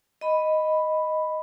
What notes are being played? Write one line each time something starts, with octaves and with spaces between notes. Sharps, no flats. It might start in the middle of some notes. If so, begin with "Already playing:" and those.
D#5 B5